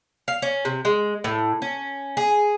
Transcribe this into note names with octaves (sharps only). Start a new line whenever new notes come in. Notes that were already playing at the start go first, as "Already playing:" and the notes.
F5
C#4
C3
G#3
A2
C#4
G#4